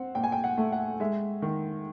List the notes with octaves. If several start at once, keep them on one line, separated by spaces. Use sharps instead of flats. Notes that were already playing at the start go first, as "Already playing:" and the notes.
Already playing: C4 F#5
A#2 G5
G#5
G5
F#5
A3
F#5
G#3 E5
D#3